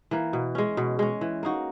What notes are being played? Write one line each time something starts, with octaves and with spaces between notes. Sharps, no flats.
E3 A#3
B2
G#3 C#4
B2
G#3 C#4
E3
A#3 D#4 F#4